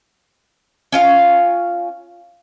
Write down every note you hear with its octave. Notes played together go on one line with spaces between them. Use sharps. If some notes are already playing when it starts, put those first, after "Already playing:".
C#4 F4 F5